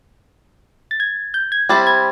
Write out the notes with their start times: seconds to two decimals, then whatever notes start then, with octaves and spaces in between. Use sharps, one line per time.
0.91 A6
1.00 G#6
1.34 G6
1.52 G#6
1.69 G3 C4 E4 A6
1.87 G#6